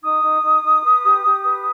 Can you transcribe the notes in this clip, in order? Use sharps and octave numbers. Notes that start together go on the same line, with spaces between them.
D#4 D#6
D#4
D#4
D#4
B4
G4
G4
B4